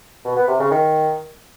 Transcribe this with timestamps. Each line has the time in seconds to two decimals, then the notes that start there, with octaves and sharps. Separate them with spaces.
0.24 B2
0.36 B3
0.48 C3
0.59 C#3
0.71 D#3